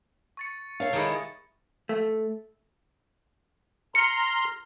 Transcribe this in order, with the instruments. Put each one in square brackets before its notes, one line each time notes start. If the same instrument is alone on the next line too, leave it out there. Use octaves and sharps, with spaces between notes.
[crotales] C#6 A6 C#7
[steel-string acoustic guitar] A4 C#5 F5
[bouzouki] D#3 G#3 E4
[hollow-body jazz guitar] A3
[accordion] A#5 C6 F6 [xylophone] C#7